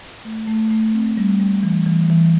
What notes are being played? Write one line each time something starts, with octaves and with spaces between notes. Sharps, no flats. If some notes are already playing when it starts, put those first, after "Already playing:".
A3
A3
A3
C4
G3
G3
E3
E3
E3